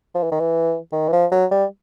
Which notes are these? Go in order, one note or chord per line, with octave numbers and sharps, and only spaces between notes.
F3
E3
D#3
E3
D#3
E3
F3
F#3
G3